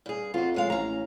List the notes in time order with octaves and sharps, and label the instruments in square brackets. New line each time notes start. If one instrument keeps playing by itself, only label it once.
[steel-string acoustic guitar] G2 G#4
[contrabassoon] F2 [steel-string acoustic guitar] F4 F#4
[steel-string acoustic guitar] F#2 G#3 F5
[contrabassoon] A1 [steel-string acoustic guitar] C#4 A#5